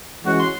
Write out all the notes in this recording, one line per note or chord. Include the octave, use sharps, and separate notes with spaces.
E3 G#3 C#4 F#4
C6